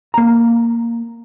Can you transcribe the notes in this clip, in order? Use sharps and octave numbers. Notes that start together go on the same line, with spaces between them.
A#3 A#5